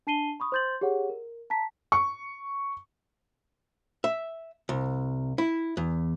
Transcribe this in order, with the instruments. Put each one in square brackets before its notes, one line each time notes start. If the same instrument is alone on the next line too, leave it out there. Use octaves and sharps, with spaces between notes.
[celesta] D4 A5 C7 D#7 G7
B5 C#6 D#6
C5 C6 G6 A6 F#7
G4 G#4 C#5 F#5
A#4
A5 A#5 B6
[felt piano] C#6
[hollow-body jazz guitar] E5
C2
E4
E2